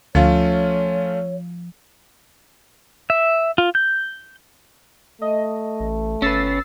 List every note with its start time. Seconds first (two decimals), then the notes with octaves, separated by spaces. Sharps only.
0.15 D2 F3 A3 C#4 F4 C#5 F5
3.10 E5
3.58 F4
3.75 G6
5.22 A3 D#5
5.80 A1
6.22 G1 C#4 B4 E6 A6 C7